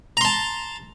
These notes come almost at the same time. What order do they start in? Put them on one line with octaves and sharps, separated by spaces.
A#5 C6 A5